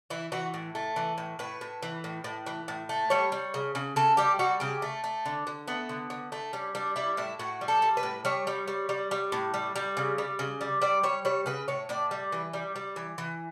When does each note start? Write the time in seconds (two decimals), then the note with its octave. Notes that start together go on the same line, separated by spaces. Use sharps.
0.10 E3 E4
0.32 E3 F#4
0.54 A2
0.75 A3
0.96 E3
1.18 A2
1.39 A2 B4
1.61 A2
1.82 E3
2.04 A2
2.24 A2
2.46 E3
2.68 A2
2.89 A3
3.10 G3 C#5
3.32 G3
3.54 C#3
3.75 C#3
3.96 C#3 A4
4.17 G3 G4
4.39 G3 F#4
4.60 C#3 G4
4.82 A3
5.04 A3
5.26 D3
5.47 D3
5.68 A3 B3
5.89 D3
6.10 D3
6.32 A3
6.53 G3 C#4
6.75 G3 D4
6.96 G3 E4
7.17 A2 E4
7.39 A2 F#4
7.61 G3
7.68 A4
7.82 G3
7.97 B4
8.03 A2
8.25 G3 C#5
8.47 G3
8.67 G3
8.89 G3
9.11 G3
9.32 A2
9.54 G3
9.76 G3
9.97 C#3
10.18 G3
10.39 C#3
10.61 G3
10.82 G3 D5
11.03 G3 C#5
11.25 G3 C#5
11.46 C#3 B4
11.68 A2 C#5
11.89 A2 D5
12.11 G3
12.32 E3 B4
12.53 G3
12.76 G3
12.96 E3
13.18 E3